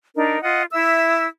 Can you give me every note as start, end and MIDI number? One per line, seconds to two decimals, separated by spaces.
0.15 0.39 62
0.15 0.39 63
0.15 0.39 70
0.41 0.62 65
0.41 0.62 75
0.41 0.62 78
0.71 1.26 64
0.71 1.26 76
0.71 1.26 88